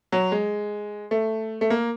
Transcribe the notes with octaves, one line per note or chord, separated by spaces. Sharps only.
F#3
G#3
A3
A3
A#3